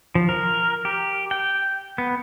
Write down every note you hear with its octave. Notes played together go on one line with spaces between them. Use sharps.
F3
A#4
G4
G5
B3